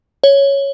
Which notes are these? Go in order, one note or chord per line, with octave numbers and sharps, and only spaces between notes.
C#5